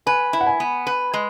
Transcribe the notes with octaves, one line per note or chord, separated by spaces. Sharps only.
B4 G#5
E4
F#5
G#5
B3
B4
G#3